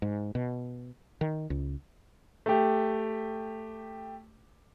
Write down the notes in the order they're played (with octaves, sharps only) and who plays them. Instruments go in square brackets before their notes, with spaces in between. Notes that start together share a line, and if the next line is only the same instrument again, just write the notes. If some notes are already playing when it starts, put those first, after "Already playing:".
[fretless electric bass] G#2
B2
D#3
C#2
[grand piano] A3 G4